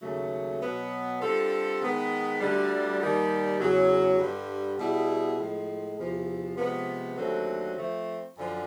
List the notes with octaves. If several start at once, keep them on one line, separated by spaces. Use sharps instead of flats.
D#2 C#3 F#3 A3
B2 F#3 B3
D3 G3 C4 F4 A4
D#3 G#3 B3
D2 D3 G3
D#2 D#3 G3
E2 C#3 F#3
G2 D3 G3
B2 G3 B3 E4 G#4
A2 F3 G#3
E2 C3 F3
C3 F3 G#3 B3
D#2 D3 F#3 A3 C4
F3 A3 C4
F#2 D3 F3